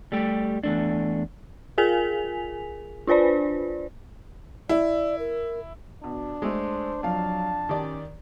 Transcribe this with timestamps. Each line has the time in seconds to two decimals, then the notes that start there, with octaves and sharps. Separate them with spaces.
0.12 G3 A3 G4
0.63 E2 A3 D4
1.78 F4 G#4 A#4 G#5 B6 F7
3.07 D4 F4 B4 C5 D5
4.69 E4 D5
5.19 A#4
6.04 B2 D4
6.42 G#3 A3 C5
7.03 F2 F#3 F5 A5
7.69 D#3 C#4 G4 D5